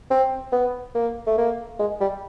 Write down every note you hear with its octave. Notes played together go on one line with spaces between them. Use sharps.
C4
B3
A#3
A3
A#3
G#3
G3